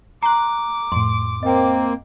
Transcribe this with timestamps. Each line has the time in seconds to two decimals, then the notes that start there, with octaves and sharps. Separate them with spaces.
0.23 A#5 C6 D6 F#6
0.92 F2 A2 C6
1.43 A#3 C4 D#5 G5